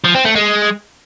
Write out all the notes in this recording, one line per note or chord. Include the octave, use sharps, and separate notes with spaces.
F3
C4
A3
G#3